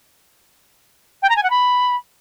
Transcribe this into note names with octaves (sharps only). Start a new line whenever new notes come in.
G5
A#5
G#5
F#5
B5